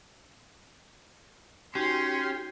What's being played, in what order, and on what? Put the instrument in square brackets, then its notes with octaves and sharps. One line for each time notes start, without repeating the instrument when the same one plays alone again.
[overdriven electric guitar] C#4 [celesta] D#4 F#4 C7 [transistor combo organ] G4 [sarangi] C6